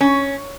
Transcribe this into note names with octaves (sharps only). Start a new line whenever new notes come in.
C#4